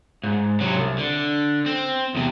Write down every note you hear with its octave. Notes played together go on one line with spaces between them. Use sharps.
G#2
C3 F#3
C2
D3
C4
E2 C3